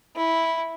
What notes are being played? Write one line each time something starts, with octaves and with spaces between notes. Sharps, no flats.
E4